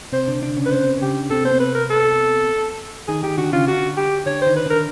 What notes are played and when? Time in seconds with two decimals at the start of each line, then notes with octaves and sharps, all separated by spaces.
0.12 C3 C4 C5
0.28 D3 D4
0.42 D3 D4
0.57 C#3 C#4
0.65 B4
0.72 C#4 C5
0.84 C4
0.97 C#3 C#4 G4
1.30 C3 C4 A4
1.44 B3 C5
1.51 C3 C4
1.60 B4
1.75 A#4
1.90 A4
3.08 D#3 D#4 G#4
3.23 D#3 D#4 G4
3.37 D3 D4 F#4
3.52 C#3 C#4 F4
3.67 D3 D4 F#4
3.97 G4
4.26 D3 D4 C#5
4.42 D#3 D#4 C5
4.56 B4
4.66 D3 D4 A#4